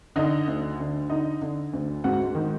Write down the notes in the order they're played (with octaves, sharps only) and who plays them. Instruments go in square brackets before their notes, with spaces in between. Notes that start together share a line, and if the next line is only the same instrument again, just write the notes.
[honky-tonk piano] D3 D#4 D#5
D2
D3
D3 D#4 D#5
D3
D2
G#2 F#4 F#5
D#3